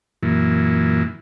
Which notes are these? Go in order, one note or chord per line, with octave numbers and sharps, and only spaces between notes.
F#2 A#2 E3